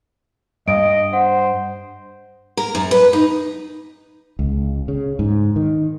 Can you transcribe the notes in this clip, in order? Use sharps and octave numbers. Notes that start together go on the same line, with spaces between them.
G2 D#5 D7
C5 F#5
A#4
F#2
B4
D#4
C#2
C#3
G#2
D#3